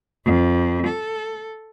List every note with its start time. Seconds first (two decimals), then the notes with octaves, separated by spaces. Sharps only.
0.25 F2
0.87 A4